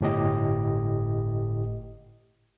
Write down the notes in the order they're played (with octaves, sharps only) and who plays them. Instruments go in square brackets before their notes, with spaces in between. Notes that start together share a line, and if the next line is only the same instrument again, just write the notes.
[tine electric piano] G1 A2 G4 D#5